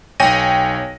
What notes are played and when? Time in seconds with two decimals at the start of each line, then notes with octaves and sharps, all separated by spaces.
0.20 B1 C#5 G5 G#5 A#6 D#7